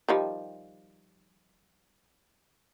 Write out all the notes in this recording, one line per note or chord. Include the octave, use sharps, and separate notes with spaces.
D#3 F3 G3